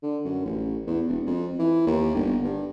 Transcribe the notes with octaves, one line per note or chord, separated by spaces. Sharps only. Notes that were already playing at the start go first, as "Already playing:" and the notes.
D3
F#2
A1
E2
E1
F2
E3
D#2
G1
G2